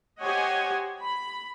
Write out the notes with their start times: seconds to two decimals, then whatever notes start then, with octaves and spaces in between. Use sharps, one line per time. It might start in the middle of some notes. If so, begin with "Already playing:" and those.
0.22 G4 C5 C#5 D#5 F#5 G#5
1.00 B5